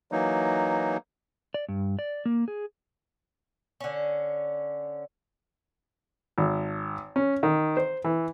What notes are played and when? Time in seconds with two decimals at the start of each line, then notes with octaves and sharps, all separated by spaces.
0.12 E3 F#3 A#3 D#4
1.54 D5
1.68 G2
1.99 D5
2.26 A#3
2.48 G#4
3.81 D3 C#4
6.38 G#1
7.16 C#4
7.43 D#3
7.77 C5
8.05 E3